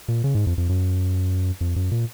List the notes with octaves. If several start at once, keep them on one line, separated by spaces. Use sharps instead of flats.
A#2
C#3
G#2
F2
F2
F#2
F2
F#2
A#2